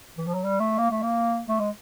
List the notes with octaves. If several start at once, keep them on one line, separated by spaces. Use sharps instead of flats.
E3
F3
F#3
G3
A3
A#3
A3
A#3
A3
G#3